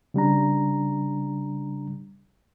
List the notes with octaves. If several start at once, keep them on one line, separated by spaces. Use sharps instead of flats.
C#3 G3 D4 A#5